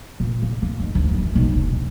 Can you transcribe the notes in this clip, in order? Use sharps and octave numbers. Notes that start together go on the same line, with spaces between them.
A#2
A#3
A#3
G#2
D2
F#2
E3
B1
E1
A2